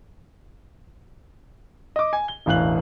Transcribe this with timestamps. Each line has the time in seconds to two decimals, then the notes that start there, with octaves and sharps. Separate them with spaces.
1.96 D#5 D6
2.13 G#5
2.28 G7
2.46 E1 A1 E3 F5 F#6 F#7